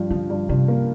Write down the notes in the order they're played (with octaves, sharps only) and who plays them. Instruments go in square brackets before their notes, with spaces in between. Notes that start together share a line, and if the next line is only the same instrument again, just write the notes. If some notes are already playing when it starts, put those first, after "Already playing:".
Already playing: [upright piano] G2 F3
[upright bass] D3 [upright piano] F3
[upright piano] G2
[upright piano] G2 [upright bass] C3
[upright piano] A#3